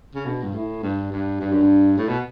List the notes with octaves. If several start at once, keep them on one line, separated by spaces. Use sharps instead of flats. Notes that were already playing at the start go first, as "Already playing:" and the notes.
C#3
B2 D4
G2
A2 E4
G2 D4
G2
G2 D4
F#2
G2
A2
B2